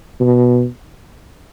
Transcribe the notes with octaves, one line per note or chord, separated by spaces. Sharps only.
B2